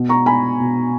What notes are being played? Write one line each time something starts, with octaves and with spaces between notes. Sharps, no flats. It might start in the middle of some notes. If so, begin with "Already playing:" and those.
Already playing: B2
A#5 C#6
G#5 B5
B2